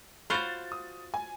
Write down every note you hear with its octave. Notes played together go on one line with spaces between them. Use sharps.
F4 F#4 C5 B5 A6
D#6
G#5